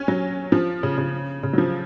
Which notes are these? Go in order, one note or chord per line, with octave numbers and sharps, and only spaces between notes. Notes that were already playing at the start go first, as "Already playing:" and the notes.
Already playing: C#4
F#3
F3
C#3
C#3
C#3
F#3
F3